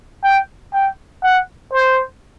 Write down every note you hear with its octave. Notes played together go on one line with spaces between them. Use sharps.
G5
G5
F#5
C5